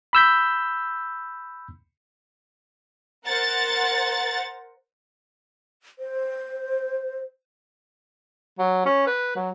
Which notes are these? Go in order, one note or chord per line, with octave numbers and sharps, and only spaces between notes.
B5 E6 G6 B6
A#4 C5 F#5 A6
C5
F#3
C#4
B4
F#3